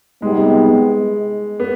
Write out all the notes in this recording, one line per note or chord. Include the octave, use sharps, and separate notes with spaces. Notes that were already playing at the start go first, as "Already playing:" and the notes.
C3 G3 G#3 B3 D#4
B3